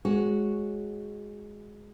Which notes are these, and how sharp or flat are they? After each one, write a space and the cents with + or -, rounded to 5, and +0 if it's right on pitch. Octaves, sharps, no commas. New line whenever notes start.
G#3 +0 F#4 -5 C#5 +0